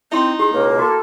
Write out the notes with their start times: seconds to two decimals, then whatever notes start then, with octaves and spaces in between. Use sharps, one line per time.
0.12 C4 D#4 E4 C6
0.39 G4 G#4
0.53 C#2 B2 A#3
0.79 F#4 A4